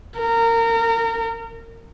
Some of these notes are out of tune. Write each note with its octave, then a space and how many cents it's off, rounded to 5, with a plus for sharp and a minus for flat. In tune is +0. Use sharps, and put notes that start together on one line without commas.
A#4 -25